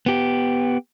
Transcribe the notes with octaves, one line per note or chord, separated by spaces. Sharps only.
B3 G4